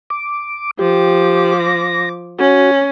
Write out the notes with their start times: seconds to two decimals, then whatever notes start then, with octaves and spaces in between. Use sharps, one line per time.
0.10 D6
0.79 F3 G4 D6
1.60 A#6
2.39 C#4 F#4